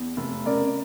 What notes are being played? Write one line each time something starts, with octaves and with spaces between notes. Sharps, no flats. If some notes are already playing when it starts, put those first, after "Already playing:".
Already playing: E2
F1
C#3 A#4 D5